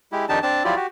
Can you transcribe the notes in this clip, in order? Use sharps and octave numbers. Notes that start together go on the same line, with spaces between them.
G#3 E4 G4
F2 D#3 D4 D#4 G4 A5
C4 D4 A5
F3 F#3 E4 F4 G4 D5
F#4 G4